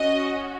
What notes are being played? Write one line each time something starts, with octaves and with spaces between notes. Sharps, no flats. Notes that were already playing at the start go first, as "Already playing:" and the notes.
Already playing: C#4 F#4 D#5